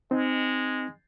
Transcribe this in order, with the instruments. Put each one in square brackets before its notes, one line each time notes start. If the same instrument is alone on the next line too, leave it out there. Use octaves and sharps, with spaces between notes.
[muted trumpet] G#3 [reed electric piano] C4 D#4